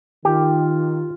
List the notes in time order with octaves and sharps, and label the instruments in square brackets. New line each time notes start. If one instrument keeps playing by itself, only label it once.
[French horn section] D#3 [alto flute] F4 [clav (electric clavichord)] G4